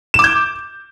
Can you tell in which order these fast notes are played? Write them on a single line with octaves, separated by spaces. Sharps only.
E7 D6 G6